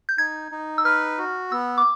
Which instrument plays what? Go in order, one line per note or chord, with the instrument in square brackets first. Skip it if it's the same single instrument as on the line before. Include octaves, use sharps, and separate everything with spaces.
[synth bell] G6
[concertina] D#4 [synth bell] G#6
[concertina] D#4
[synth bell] E6
[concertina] B4 [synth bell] F6
[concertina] F#4
[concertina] B3 [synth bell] E6
[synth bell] D6